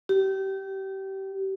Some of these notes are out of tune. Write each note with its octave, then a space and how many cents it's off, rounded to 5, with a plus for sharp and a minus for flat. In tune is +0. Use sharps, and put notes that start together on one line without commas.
G4 -25